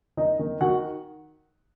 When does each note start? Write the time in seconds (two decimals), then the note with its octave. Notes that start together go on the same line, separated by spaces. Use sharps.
0.17 D#3 D#4 D#5
0.39 D#3
0.60 D#3 F#4 F#5